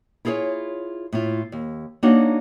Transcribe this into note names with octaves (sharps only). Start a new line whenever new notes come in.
E4 F4 G#4 B4 C#5
A2 E4 F4
D#2
A#3 D4 D#4 F#4 C#5 D#5